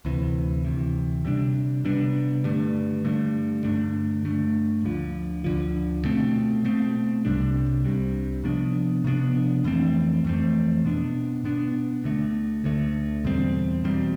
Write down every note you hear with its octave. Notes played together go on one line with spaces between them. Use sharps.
D2 C3 E3
D2 C3 E3
C3 G3 B3 D4
C3 G3 B3 D4
G2 D3 A3
G2 D3 A3
G2 D3 A3 D4
G2 D3 A3 D4
D2 D3 F3
D2 D3 F3
B2 A3 C4
B2 A3 C4
C2 C3 G3 D4
C2 C3 G3 D4
C3 F3 B3 D4
C3 F3 B3 D4
F2 E3 A3 C4
F2 E3 A3 C4
B2 B3 D4
B2 B3 D4
D2 D3 A3
D2 D3 A3
E2 B2 G3 C4
E2 B2 G3 C4